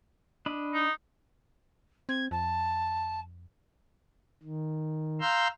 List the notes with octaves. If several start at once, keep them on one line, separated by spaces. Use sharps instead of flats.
D4 D#5 B5
D#4
C4 G#6
F2 A5
D#3
F5 A#5 C6 E6 F6 G6